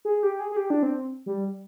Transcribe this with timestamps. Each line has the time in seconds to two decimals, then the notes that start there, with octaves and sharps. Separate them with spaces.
0.05 G#4
0.23 G4
0.40 G#4
0.52 G#4
0.56 G4
0.70 D4
0.83 C4
1.26 G3